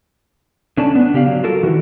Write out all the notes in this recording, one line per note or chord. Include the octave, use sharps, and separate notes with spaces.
D3 C#4 D5 A5
B3 D4
C#3 G4 D5 F5
F#3
F4 F#4 A4 A#4
D#3 E3 F#4